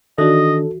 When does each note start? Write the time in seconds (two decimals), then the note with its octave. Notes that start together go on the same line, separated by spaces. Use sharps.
0.18 D#3 E3 D4 F#4 A4 D#5